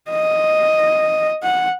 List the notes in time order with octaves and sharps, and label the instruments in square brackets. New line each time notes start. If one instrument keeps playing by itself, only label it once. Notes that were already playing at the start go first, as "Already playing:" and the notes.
[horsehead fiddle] D#5
F#5